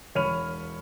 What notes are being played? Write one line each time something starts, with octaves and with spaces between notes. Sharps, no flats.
E1 C#5 B5 F6 D#7 F7